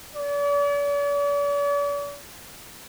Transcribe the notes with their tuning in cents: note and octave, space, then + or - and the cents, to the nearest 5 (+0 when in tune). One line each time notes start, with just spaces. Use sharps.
D5 -45